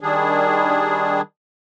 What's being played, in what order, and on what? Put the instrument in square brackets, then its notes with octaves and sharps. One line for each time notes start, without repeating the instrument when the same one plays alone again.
[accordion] D#3 G3 D4 G#4